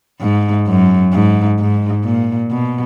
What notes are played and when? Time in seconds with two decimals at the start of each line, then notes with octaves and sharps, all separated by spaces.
0.21 G#2
0.67 F#2
1.13 G#2
1.59 G#2
2.05 A#2
2.51 B2